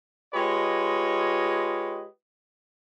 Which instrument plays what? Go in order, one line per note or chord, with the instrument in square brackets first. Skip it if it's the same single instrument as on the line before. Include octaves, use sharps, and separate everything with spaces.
[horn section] G#3 F4 G4 B4 C#5 D#5